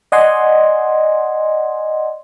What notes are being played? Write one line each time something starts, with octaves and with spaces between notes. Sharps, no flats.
D5 D#5 F#5 G#5 C6